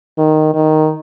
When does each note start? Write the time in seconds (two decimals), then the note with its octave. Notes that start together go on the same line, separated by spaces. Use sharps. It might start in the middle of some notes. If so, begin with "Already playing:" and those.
0.18 D#3
0.54 D#3